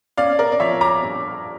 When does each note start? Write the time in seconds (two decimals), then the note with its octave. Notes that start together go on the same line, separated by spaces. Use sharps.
0.17 C#4 D5 F5
0.39 A#4 D5
0.52 D5
0.60 F3 C#5 E5
0.81 A#5 D6
1.02 G2